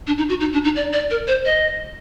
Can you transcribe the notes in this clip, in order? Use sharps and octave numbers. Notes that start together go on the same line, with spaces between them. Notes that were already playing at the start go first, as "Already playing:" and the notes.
D4
D#4
F#4
D#4
D4
D#4
D5
D5
A#4
C5
D#5